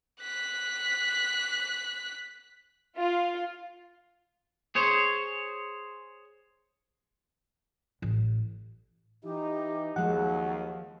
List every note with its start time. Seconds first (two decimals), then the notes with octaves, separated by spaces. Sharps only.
0.21 F#6 B6
2.98 F4
4.75 G#4 C5 C#5
8.02 A1
9.24 E3 D#4 G4
9.96 D#2 F3 F#3 G#3 F#5